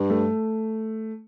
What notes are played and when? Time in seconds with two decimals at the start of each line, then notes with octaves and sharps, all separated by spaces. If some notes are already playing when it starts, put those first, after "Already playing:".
Already playing: G2
0.10 A3